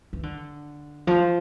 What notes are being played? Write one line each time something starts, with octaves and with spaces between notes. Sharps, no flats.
E3
D3
F3